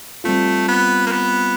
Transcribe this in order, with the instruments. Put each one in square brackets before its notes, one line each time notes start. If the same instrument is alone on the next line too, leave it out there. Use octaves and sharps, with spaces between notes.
[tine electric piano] G3 C4 F4 [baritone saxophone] A3
[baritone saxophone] B3
A#3
B3